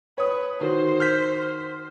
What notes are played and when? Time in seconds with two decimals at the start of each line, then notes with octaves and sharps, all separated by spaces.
0.18 B4 C#5 D#6
0.61 D#3 F#4 C5
1.00 F6 G6 B6